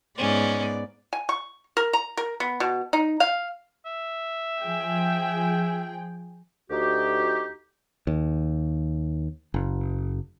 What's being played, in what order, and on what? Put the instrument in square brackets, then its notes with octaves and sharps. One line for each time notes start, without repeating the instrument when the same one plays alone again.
[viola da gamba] G#2 B3 D5 [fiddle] C#4
[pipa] G#5
C#6
A#4
A#5
A#4
B3
B2
D#4
F5
[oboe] E5
[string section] F3 G#4 G5
[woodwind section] D2 D#4 F#4 G4
[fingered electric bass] D#2
F#1